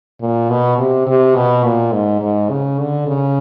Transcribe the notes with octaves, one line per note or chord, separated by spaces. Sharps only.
A#2
B2
C3
C3
B2
A#2
G#2
G#2
C#3
D3
C#3